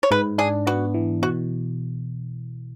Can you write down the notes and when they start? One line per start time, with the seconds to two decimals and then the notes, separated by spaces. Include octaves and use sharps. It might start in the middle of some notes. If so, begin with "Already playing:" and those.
0.03 C#5
0.11 G#2 B4
0.38 D4 G#4
0.67 B3 F#4
0.94 E3
1.22 B2 F#4